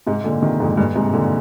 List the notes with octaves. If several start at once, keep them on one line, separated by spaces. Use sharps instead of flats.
G#2 C3
A#2 D3
C3 D#3
F2 G#2
G2 A#2
G#2 C3
A#2 D3